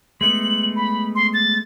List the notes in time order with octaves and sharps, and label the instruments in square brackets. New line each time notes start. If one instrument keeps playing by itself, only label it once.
[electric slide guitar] G#3 A3 B3 [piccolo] F#7
[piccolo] B5
C6
A6